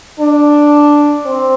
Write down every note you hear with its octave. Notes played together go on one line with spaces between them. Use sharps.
D4
C4